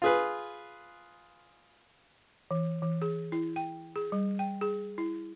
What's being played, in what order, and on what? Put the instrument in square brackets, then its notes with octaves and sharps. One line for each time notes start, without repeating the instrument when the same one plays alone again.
[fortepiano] F4 G#4 B4
[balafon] E3
E3
G#4
E4
G5
G#4
G3
G5
G#4
E4